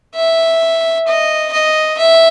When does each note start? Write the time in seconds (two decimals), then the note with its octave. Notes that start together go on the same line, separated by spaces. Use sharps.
0.16 E5
1.07 D#5
1.53 D#5
1.98 E5